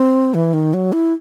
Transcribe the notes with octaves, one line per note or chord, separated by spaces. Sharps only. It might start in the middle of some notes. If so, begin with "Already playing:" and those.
Already playing: C4
E3
D#3
F#3
E4